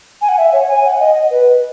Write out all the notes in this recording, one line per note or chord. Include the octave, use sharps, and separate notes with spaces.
G#5
F#5
E5
C#5
G#5
F#5
D#5
B4